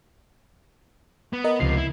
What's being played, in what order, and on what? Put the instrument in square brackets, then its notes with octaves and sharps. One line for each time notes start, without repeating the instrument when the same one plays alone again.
[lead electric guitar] B3
[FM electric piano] A#4 D#5
[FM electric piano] C#2 C7 [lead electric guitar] C3 F3
[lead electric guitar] E4